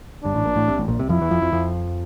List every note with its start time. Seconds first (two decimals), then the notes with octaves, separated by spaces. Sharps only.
0.24 G1 G2 D4
0.35 A1 A2
0.45 A#1 A#2
0.56 A1 A2
0.67 C2 C3
0.78 A1 A2
0.88 A#1 A#2
0.99 C2 C3
1.09 F2 F3 E4
1.21 E2 E3
1.31 F2 F3
1.41 F2 F3
1.52 F2 F3